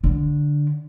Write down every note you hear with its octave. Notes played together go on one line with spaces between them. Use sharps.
D3